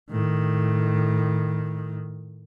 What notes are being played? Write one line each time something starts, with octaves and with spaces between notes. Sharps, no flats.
A2 D#3